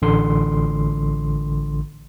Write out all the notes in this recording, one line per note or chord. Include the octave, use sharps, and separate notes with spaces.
A1 D3 C6